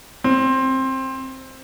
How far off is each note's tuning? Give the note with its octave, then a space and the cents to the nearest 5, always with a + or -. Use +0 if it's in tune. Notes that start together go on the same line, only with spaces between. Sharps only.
C4 +15